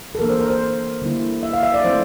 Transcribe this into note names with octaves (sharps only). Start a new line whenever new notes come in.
A4
E3 A#3 D4 A#4
C5
A#4
C5
D3 G3 A#3 E4
E5
F5
E5
D5
F3 A3 C4 E4 C5